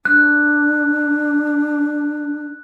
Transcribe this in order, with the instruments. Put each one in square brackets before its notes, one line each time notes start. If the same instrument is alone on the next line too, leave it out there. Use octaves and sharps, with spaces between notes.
[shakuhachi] D4 [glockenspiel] F#6